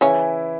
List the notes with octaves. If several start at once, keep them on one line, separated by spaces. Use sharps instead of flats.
C#3 E3 C#4 E4